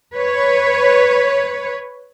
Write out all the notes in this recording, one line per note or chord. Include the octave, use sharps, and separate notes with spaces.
B4 C#5